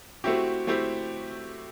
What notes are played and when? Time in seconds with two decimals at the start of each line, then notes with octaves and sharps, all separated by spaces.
0.24 A3 C4 E4 F#4 G4
0.67 A3 C4 E4 G4